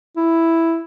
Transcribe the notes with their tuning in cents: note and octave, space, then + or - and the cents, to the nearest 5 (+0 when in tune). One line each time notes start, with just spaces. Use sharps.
E4 +0